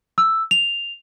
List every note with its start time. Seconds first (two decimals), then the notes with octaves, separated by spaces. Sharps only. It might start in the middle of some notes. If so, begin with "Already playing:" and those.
0.18 E6
0.51 F7